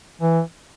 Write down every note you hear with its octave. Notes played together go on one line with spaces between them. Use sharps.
E3